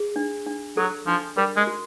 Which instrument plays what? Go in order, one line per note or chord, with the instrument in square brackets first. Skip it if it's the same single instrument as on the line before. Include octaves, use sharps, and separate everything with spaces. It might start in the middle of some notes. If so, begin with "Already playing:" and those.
Already playing: [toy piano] G#4
D4
D4
[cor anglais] F#3 [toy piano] A4
[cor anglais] F3 [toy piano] D4
[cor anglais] G3 [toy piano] A#4
[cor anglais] G#3
[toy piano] F#4